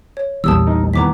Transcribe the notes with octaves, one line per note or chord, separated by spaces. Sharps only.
C#5
A#1 E2 G3 A3 A#3 A5 D#6 E6
D#4 A#4
D#2 A2 B3 A#5 D6 B6